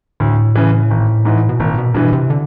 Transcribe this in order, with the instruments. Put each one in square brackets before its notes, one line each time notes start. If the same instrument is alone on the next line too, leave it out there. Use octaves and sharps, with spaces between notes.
[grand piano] D2 [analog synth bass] A2
[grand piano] C#3 E3
G#1
G#2 E3
[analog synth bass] B2
[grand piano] G#1 [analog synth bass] A#2
[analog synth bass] B2
[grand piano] G2 E3 [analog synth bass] B2
[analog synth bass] C3
D3